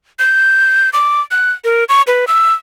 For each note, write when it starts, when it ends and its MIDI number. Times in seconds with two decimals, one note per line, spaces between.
0.19 0.90 91
0.93 1.21 86
1.31 1.52 90
1.64 1.84 70
1.89 2.02 85
2.07 2.25 71
2.27 2.53 88